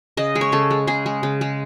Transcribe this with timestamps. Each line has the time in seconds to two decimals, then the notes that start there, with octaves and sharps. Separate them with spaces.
0.17 C#3 D#5
0.35 G#3
0.41 C#5
0.52 C#3 A4
0.71 G#3
0.87 C#3 G#4
1.06 G#3
1.23 C#3
1.41 G#3